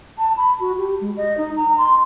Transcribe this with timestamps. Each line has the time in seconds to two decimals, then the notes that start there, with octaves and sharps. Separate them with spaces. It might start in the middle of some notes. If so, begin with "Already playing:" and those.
0.18 A5
0.37 B5
0.60 F#4
0.78 G4
1.01 G#3
1.17 D#5
1.38 D#4
1.56 A#5
1.78 C6